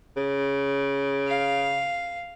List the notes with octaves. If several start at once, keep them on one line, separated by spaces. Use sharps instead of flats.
C#3
F5